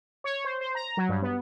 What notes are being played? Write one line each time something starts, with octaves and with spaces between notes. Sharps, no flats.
C#5
C5
C5
A#5
F#3
G2
B3